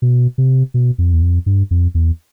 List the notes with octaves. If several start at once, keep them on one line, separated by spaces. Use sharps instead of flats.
B2
C3
B2
F2
E2
F2
G2
F2
E2